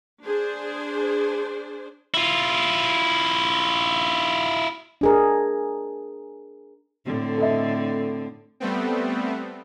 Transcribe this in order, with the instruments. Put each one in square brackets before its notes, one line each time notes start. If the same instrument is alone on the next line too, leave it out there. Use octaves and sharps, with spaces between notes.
[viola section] D4 G#4 C5
[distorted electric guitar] E4 F4
[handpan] D4 G#4 A#4
[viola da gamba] A2 D3 C4
[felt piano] A4 D#5 E5
[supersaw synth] G3 A3 B3 C4